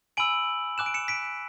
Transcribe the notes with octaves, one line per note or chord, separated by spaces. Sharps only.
G#5 B5 E6 D7 F#7
G#5 D6 F#6 E7
D7
C#7 E7
B6 D7